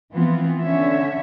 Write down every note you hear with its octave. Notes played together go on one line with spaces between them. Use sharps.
E3 F3 B3 C4 F4
D3 C#4 C#5 E5